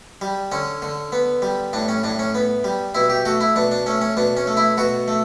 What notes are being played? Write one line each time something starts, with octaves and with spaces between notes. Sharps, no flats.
G3
D3 C#4
D3
B3
G3
A2 D4
C#4
A2 D4
C#4
B3
G3
B2 E4
G4
A3 F#4
E4
B2 D4
D4
A3 C#4
C#4
B2 D4
C#4
A3
E4
B2 F#4
A3